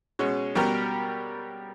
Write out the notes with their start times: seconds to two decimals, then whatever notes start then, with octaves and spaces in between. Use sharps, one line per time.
0.19 B2 G#3 C#4
0.55 B2 G3 B3 G4 A#4